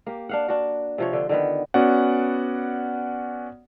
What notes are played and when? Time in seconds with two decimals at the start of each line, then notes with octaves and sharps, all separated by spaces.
0.06 A#3 G4
0.29 D4 F5 F#5
0.48 D4 F#4
0.98 C3 F3 C#5
1.13 D3
1.29 D3 D#3 B3
1.74 B3 C#4 F#4 D5 F#5